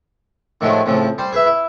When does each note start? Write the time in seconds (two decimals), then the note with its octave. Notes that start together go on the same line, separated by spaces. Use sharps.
0.61 A2 D#3 F3 F#3 G#3 A3
0.86 F2 A2 C#3 F3
1.18 G3 C5
1.32 G#4 B4 E5
1.46 E4